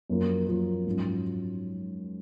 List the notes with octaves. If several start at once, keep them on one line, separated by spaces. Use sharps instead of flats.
F#2 F3 A#3 F4 A#4
F#2 F3 A#3 F4 A#4
G#2 F#3 C#4 F4